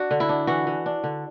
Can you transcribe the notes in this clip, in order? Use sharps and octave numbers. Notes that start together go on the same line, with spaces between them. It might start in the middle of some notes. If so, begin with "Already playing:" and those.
Already playing: D4 F#4
D3
E4
D4
E3 F#4
E3
D4
D3